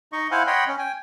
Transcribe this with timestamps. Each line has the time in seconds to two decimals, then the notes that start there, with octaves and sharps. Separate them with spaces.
0.13 D#4 D#5 C#6
0.31 E4 C5 F5 F#5 G#5
0.47 C#5 D#5 F#5 G5 B5 C6
0.68 C#4
0.79 G5 G#5